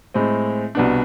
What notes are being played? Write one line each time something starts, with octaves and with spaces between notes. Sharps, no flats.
A2 G#3 C4
C2 B2 B3 D4